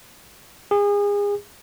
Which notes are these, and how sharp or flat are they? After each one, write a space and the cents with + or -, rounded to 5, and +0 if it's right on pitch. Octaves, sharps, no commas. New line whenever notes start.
G#4 -30